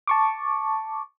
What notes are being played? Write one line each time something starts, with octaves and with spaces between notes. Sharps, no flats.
A5 C#6 D6